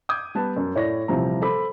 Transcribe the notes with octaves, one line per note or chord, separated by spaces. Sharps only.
D6 D#6 G6 G#6
G3 B3 B4 A5
F#2
A2 C#5 D5 C#6 A#6
D#1 C3 E3 F3 G3 A#5
A4 C5 B5 D6